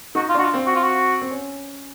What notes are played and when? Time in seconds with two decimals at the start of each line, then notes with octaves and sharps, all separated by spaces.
0.15 D#4 F#4
0.29 F4
0.34 D4 F#4
0.45 F4
0.54 C4
0.67 F#4
0.76 F4
0.84 F#4
1.21 C4
1.31 C#4